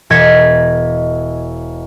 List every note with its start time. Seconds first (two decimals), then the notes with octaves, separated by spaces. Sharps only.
0.10 E1 D#5 G#6 B6 C#7 E7